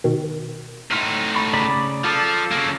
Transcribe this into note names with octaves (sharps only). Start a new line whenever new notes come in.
B2 D#3
A2 D#4 C6 F6 B6
B5 C#6 A6
C#3 D5 A#5 B5 B6
F3 F4 A4 D5
C#3 A#3